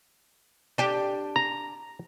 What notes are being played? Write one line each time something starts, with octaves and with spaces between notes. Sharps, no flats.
D4 G4
A#5